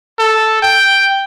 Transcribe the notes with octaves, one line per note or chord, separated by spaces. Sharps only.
A4
G5